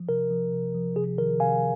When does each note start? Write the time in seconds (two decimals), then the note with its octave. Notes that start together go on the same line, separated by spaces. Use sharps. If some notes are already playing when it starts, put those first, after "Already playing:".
Already playing: F3
0.09 C3 A#4
0.30 F3
0.52 C3
0.74 F3
0.96 C3 G#4
1.18 D#3 A#4
1.40 C3 F5 G#5